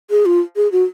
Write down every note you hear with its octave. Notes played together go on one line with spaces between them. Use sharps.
G#4
F4
G#4
F#4